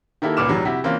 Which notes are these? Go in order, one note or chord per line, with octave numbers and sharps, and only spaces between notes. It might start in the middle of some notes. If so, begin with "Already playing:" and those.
D#3 A#3 E4 G4 A4
C#2 A#2 B4 D6 F6 E7
F2 G#2 F#3 G3
C3 E4 F#4 G4
E3 A#3 C4 C#4 F4